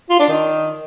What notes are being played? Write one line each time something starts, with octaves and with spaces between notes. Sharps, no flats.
F4
D4
D#3